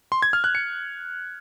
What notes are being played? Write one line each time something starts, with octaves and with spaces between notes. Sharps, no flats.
C6
G#6
F6
F#6
C#7